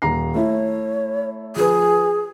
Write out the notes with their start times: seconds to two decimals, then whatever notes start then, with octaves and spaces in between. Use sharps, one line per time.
0.02 D#1 A#5 C7
0.35 A3 E4 C#5
1.56 F3 G#4 B4